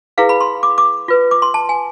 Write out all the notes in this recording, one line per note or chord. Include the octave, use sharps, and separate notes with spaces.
E4 G#4 B4 F5
B5
C6
D6
D6
F4 B4
D6
C6
A5
G#5